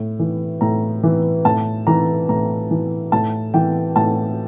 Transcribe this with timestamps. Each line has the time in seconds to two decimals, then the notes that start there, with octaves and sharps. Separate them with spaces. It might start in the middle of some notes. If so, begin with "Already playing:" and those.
Already playing: A2
0.19 E3
0.61 A2 A#5
1.03 E3
1.45 A2 A5
1.87 E3 A#5
2.29 A2 A#5
2.71 E3
3.12 A2 A5
3.54 E3 G5
3.96 A2 A5